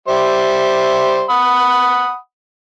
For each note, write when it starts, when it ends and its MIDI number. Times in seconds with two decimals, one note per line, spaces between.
0.08 1.24 55
0.08 1.24 72
0.08 1.24 76
1.30 2.16 78
1.30 2.16 83
1.30 2.16 87